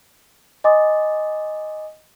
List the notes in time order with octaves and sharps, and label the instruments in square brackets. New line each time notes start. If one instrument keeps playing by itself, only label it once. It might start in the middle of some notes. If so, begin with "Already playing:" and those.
[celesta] D#5 G#5 C6 D6 D#6 A6